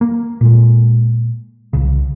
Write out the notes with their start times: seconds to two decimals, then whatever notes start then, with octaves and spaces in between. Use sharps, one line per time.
0.01 A#3
0.41 A#2 G#3
1.73 C2 C#3